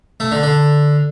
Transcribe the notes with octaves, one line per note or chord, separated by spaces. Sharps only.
A3
D3
D3